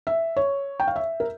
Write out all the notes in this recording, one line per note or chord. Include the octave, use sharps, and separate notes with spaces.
E5
C#5
G5
F5
E5
A#4